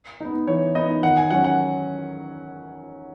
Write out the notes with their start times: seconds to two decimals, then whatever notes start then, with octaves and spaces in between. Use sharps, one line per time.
0.21 B3 D#4
0.47 E3 C#5
0.75 B3 D#4 D#5
1.03 D#3 F#5
1.17 G#5
1.30 F#3 C#4 F#5
1.44 F#5